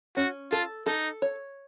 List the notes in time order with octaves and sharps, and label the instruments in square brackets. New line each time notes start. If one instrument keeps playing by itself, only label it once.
[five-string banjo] C#4 [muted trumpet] F#4
[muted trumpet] F4 [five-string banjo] A4
[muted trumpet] D#4 [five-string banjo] A4
[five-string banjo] C#5